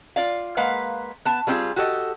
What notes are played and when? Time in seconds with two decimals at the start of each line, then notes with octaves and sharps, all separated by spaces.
0.16 F4 D5 F5
0.57 G#3 A#3 B4 F5 F#5
1.25 B3 A5
1.47 G3 A#3 C4 C#4 F4 G#4
1.76 F#4 G4 A4 D5 D#5